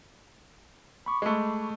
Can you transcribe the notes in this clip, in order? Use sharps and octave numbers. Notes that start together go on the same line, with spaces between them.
B5 C#6 D6
G#3 A3